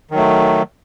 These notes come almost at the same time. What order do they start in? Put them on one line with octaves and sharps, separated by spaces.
D#3 F#3 A3